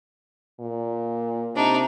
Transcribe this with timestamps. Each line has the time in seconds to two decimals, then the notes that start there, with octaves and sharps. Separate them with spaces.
0.60 A#2
1.55 C3 D4 D#4